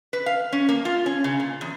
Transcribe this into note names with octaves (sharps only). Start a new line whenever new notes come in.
B4
F5
C#4
A#3
F4
C#4
C#3
A#2
E2